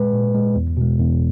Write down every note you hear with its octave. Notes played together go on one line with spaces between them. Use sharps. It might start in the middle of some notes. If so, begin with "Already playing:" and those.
Already playing: A#2 G#3 B4
A#2
G#3
E2
B2 G#3
E2